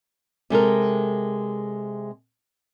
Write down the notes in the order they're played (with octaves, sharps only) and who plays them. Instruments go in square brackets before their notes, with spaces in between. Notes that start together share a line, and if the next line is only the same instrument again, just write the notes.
[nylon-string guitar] C3 G#3 A4 A#4